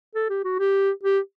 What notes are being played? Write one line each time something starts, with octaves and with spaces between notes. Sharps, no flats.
A4
G4
F#4
G4
G4